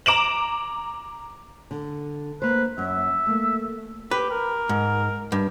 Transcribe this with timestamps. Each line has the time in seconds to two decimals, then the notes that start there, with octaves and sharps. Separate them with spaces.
0.06 A#5 D6 D7 E7 F#7
1.71 D3
2.42 A#3 B4 C5
2.78 F#2 E5
3.27 A3 A#3
4.11 G4 B4
4.31 A#4
4.69 G#2
5.32 G2